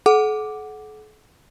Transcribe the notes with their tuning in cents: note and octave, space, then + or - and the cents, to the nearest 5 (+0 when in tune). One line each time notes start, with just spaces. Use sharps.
A4 -45 F#5 +0 D6 +0